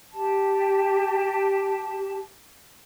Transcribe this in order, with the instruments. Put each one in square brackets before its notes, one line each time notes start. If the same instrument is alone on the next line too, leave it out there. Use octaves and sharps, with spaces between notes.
[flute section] G4 A5